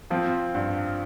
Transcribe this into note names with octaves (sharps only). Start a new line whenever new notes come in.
F3 C4 F4
G2